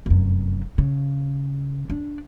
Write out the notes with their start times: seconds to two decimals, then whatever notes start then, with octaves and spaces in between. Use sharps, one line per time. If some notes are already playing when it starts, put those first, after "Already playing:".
0.06 F1 F#2
0.78 C#3
1.90 D4